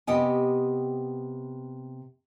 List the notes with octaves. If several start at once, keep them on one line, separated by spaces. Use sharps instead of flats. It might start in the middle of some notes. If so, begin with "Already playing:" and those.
C3 B3 G4 D#5 G#5